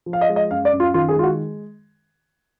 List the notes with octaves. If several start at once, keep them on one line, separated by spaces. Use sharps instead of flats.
F3
F5
D#5
G#3
D#5
F#2 F5
D5
F#2
F4
D#3 F4
G#4
G#3 F4
F#4